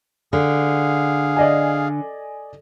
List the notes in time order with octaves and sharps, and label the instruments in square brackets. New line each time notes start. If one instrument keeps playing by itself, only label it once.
[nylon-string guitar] D3 [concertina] G#4 F5
[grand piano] D5 D#5 G#5